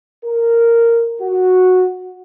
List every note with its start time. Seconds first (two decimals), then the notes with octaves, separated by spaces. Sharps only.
0.25 A#4
1.22 F#4